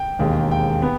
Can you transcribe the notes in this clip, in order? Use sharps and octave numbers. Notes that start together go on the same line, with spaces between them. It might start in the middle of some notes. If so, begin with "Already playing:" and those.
Already playing: G5
E1 D#2 D#3 G#3
G5
B3